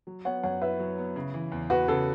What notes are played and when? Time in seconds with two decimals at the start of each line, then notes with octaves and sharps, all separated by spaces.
0.07 F#3
0.25 B3 C#5 F#5
0.43 F#2 C#5 F#5
0.61 E4 B4 E5
0.79 F#3
0.98 B3
1.16 C#3
1.34 E3
1.52 E2
1.70 E2 F#4 B4
1.88 C#3 A4